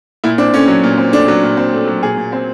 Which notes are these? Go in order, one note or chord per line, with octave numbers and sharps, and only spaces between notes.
A#2 E4
C4 D4
A3 C#4
F#3
A#2
C4
A3 D4
F#3
A#2
C4
A3
F#3
A#2 G#4
A#2
C4